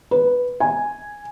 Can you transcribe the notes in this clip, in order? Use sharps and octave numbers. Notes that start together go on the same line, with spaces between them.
B4
G#5